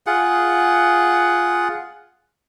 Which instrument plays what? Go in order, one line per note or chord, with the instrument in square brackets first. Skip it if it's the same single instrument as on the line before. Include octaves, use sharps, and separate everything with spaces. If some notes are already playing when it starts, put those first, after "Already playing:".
[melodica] F4 G#4 F#5